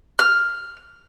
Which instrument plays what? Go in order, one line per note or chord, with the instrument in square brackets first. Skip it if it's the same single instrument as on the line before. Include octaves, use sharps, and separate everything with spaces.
[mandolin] F6